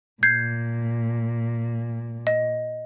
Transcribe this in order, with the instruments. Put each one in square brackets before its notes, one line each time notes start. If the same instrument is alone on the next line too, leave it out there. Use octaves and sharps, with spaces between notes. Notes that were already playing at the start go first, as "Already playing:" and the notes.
[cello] A#2 [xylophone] G6 G#6 C7
[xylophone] D#5